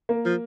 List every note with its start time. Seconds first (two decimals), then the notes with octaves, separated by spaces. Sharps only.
0.09 A#3
0.25 F3